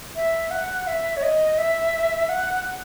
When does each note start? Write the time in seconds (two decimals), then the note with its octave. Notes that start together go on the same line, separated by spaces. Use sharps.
0.15 E5
0.50 F#5
0.87 E5
1.16 C#5
1.22 D#5
1.58 E5
2.28 F#5
2.64 F#5